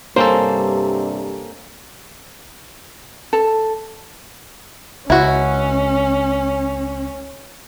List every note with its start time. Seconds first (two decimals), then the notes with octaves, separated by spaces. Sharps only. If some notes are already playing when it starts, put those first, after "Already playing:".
0.16 G2 C3 G3 A#3 C#4 A4 C5
3.33 A4
5.10 C#2 C#4 E4 F#4